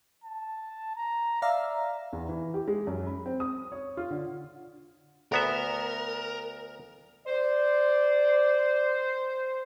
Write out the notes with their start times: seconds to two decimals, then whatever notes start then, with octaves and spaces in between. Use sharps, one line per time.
0.24 A5
0.96 A#5
1.42 D5 E5 F5 A#5
2.13 E2
2.29 E3
2.54 G4
2.68 G#3
2.87 F#2
3.07 B5
3.26 C4
3.40 D#6
3.72 C#5
3.97 F4
4.10 D3
5.32 D2 B3 A#4 E5
7.27 C5 D5